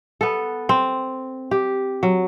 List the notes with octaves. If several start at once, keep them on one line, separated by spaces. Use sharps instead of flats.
B3 A4
C4
G4
F#3